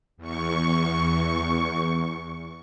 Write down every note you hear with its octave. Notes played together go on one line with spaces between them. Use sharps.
E2 C#6